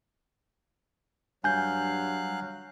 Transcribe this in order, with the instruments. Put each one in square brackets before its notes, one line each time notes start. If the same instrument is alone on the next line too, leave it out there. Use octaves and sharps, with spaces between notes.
[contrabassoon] G2 [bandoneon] F#3 F5 F#6 [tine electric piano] G#5 G6